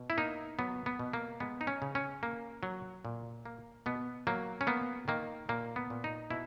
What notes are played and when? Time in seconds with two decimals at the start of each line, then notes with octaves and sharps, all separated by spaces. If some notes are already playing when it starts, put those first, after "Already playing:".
Already playing: B2
0.10 E4
0.18 A#3 D#4
0.59 F#3 B3
0.86 B3
0.99 B2
1.13 A#3
1.40 G#3 B3
1.61 D#4
1.67 C#4
1.82 C#3
1.95 C#4
2.23 A#3
2.63 F#3
3.05 A#2
3.46 A#3
3.86 B2 B3
4.27 F#3 A#3
4.61 C#4
4.67 A#3 B3
5.08 D#3 A#3
5.49 A#2 A#3
5.76 B3
5.90 A#2
6.04 D#4
6.30 B2 E4